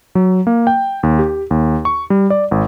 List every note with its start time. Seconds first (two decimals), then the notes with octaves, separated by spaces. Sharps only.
0.15 F#3
0.47 A#3
0.67 G5
1.03 D#2
1.19 G4
1.51 D#2
1.85 C#6
2.10 G3
2.30 D5
2.51 G#1